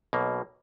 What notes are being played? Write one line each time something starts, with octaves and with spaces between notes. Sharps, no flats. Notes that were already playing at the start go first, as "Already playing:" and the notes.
B1 B2 A#3